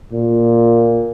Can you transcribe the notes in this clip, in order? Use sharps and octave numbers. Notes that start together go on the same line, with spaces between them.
A#2